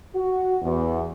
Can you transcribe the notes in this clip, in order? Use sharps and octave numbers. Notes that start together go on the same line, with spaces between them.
F#4
E2